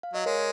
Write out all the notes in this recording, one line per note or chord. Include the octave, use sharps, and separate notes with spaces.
F5
F#3 D#5
G#3 A#4 C#5